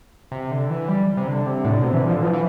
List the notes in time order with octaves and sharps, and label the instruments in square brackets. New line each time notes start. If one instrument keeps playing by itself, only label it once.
[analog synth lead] C3
D3
E3
G3
C3
D3
C3
[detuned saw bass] A2 [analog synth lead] D3
[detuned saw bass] B2
[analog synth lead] C3
[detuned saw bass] E3
[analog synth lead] D3 [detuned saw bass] F3
[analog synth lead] E3 [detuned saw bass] F3
[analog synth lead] E3